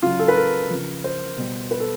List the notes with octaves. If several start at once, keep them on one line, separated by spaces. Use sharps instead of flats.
C#3 F#3 F4
A4
B4
A#4
C#3 F3
C5
B2 G3
B4
A4